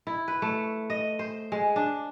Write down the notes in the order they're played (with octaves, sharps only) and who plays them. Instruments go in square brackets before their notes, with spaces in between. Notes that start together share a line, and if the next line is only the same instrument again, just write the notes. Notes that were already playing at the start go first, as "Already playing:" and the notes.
[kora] E4
B4
A3
D#5
C5
G#3
D4